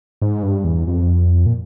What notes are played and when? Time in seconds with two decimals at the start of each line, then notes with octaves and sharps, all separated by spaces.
0.22 G#2
0.43 G2
0.64 E2
0.87 F2
1.46 A#2